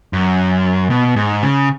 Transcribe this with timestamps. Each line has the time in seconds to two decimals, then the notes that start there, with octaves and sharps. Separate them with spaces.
0.13 F#2
0.90 B2
1.16 G#2
1.42 C#3